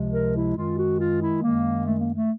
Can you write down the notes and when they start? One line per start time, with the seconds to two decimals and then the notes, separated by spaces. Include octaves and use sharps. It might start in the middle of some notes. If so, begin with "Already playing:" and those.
Already playing: C#2 C3 F3 G#3
0.12 A#4
0.34 E4
0.56 F#2 D#3 G#3 F4
0.78 F#4
0.99 F4
1.21 E4
1.42 F#2 D#3 G#3 A#3
1.85 A3
1.99 A#3
2.14 A3